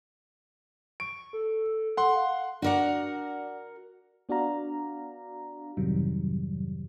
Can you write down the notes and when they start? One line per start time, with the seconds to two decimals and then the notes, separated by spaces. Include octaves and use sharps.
1.00 C#6 D7
1.33 A4
1.97 A4 F#5 C6
2.16 F5
2.62 D4 F#4 A#4 D5 F#5
4.29 B3 D4 F#4 D5 F5 A#5
5.77 F2 G#2 C3 D#3 F#3 G3